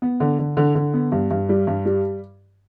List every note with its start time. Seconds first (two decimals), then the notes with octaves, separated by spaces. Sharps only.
0.02 B3
0.20 D3
0.39 D3
0.57 D3
0.75 D3
0.94 B3
1.12 G2
1.31 G2
1.49 G3
1.67 G2
1.86 G3